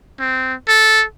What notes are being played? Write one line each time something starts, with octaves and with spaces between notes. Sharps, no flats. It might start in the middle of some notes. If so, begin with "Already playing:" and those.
C4
A4